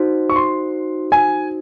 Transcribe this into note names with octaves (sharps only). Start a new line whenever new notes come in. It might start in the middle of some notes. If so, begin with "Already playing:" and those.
Already playing: D#4 F#4 C5
C#6
C6
G#5